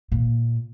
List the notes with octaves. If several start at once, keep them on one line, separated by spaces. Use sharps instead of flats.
A#2